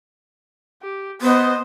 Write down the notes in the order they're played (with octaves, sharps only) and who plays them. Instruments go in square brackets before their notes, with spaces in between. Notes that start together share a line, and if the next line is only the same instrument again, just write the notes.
[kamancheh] G4
[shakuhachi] B3 [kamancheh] C5 D#5